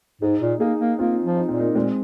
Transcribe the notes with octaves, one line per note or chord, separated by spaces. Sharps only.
G#2 D#4 G#4
A#2
A#3 D#4 G#4
A#3
A#3 C4 F4
F3
D#4
A#2 C4
A#3 D#4
A#2 G#3 C4